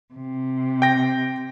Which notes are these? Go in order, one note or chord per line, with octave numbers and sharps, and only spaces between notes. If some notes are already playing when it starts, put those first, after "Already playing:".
C3
G5 A#6